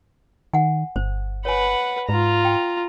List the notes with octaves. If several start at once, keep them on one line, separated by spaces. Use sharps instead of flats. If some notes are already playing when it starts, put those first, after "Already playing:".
D#3 F#5 G#5
G1 C5
B4 C#5 F#5 G#5
G#2 F4 A#5
G5